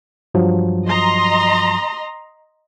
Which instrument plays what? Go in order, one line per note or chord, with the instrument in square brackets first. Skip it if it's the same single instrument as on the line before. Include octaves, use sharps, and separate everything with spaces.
[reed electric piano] G2 F3 F#3
[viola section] D#5 A#5 C6